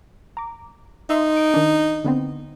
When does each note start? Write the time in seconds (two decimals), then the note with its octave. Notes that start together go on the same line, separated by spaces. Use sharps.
0.37 A#5 D6
1.10 D#4 E5 C6 D#6
1.37 D7
1.54 D#3 D4
2.04 D3 B3 C4